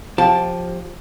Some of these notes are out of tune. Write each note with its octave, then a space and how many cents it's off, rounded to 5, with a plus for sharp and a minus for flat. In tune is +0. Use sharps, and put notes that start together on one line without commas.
F3 +20 G4 +0 A5 +0